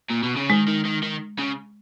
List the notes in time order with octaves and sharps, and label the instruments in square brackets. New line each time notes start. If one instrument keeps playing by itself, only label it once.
[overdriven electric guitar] A#2
B2
C#3
[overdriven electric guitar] D#3 [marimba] G#3
[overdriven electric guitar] D#3
D#3
D#3
C#3